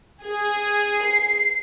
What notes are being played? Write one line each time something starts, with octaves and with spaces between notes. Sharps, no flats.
G#4
C7